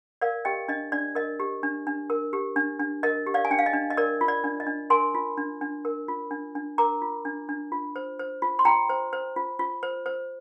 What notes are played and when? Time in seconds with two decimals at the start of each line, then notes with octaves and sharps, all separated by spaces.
0.21 A#4 D5 F5
0.45 G4 D#5 G5
0.68 D4 D#5
0.92 D4 D5
1.15 A#4 D#5
1.40 G4
1.63 D4
1.87 D4
2.10 A#4
2.33 G4
2.56 D4
2.80 D4
3.03 A#4 D#5
3.26 G4
3.34 D5 F5
3.45 G#5
3.51 D4 G5
3.59 F5
3.66 D#5
3.73 D4
3.90 D#5
3.97 A#4 D5
4.21 F4
4.28 D5
4.44 D4
4.60 D#5
4.67 D4
4.90 A#4 G#5 C6
5.15 F4
5.37 D4
5.61 D4
5.85 A#4
6.08 F4
6.31 D4
6.55 D4
6.78 A#4 A#5 D6
7.02 F4
7.25 D4
7.49 D4
7.72 F4
7.96 C5
8.19 C5
8.42 F4
8.59 C6
8.65 F4 G5 A#5
8.90 C5
9.13 C5
9.36 F4
9.59 F4
9.83 C5
10.06 C5